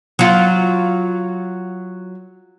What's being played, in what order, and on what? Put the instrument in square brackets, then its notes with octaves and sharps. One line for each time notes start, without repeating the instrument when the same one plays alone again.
[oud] F#3 F4